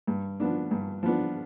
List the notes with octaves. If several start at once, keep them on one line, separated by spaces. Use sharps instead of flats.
G2
F3 B3 D4
G2
F3 B3 D4